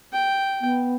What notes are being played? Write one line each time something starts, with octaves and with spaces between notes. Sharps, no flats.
G5
B3